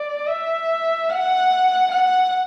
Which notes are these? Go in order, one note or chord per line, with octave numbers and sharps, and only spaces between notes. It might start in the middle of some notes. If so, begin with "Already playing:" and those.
Already playing: D5
E5
F#5
F#5